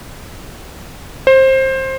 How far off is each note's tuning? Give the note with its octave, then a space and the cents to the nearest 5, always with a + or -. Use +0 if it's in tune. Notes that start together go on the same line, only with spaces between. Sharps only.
C5 +20